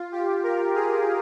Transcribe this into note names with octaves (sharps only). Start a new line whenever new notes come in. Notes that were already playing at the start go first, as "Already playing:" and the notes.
Already playing: F4
G4
A#4
G#4